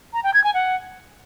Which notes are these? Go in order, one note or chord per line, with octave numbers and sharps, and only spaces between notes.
A#5
G5
G#6
G#5
F#5